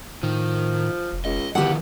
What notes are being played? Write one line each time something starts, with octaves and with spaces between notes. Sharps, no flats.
A2 D#3 F3
F1
C#2 D#5
E2 D3 D#3 F3 G4 F#5